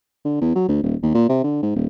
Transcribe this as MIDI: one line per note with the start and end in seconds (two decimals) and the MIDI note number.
0.25 0.37 50
0.41 0.53 40
0.55 0.66 54
0.68 0.80 38
0.83 0.95 27
1.03 1.12 39
1.15 1.27 46
1.29 1.42 48
1.44 1.59 50
1.63 1.71 44
1.76 1.87 27